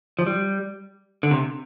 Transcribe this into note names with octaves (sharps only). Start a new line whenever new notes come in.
F3
G3
D3
C3